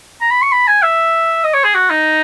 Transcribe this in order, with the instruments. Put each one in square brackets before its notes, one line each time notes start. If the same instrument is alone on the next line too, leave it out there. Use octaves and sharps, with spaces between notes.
[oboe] A#5
B5
C#6
B5
G#5
E5
D#5
C#5
G#4
F#4
D#4